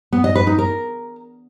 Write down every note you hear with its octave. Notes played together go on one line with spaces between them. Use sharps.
B3
D#5
B4
D#4
A#4